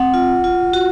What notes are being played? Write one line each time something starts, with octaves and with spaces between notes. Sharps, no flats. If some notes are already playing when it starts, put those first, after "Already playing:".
Already playing: C4 F#5
F4
F4
F#4